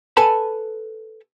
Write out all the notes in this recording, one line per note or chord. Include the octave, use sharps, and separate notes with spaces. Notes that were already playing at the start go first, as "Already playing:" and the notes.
A4 B4 G#5 A5 B5